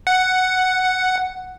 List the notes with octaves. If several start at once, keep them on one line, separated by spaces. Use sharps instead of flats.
F#5